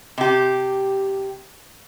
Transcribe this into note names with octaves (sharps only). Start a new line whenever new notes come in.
C3 G4